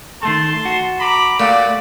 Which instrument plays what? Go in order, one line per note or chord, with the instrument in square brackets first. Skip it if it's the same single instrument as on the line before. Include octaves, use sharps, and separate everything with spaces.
[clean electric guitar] D#3 A3 A4 [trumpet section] A5 C6
[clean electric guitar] F#4
[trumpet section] A#5 B5 D6
[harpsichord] A#2 [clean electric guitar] A3 [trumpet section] F#4 G4 D5